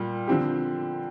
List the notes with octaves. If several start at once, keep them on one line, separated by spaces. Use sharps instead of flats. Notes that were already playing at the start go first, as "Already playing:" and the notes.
Already playing: A#2 G3
D3 F3 C4 G4